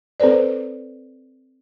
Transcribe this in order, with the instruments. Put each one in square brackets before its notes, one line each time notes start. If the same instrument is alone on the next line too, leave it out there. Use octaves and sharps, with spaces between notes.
[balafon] C4 A4 B4 C5 D5